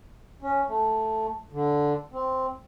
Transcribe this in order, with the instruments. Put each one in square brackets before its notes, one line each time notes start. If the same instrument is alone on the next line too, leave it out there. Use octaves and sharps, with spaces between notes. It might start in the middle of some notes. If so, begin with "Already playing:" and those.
[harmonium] C#4
A3
D3
C4